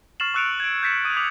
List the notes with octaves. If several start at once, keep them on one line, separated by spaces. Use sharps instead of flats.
C#6 F6 A6 C7 E7 F#7
C#6 E6 F#6 C#7 D7 F7
G#6 D7
G6 A6 B6 C#7 E7
D#6 D#7
D6 D#6 G#6 B6 F7 F#7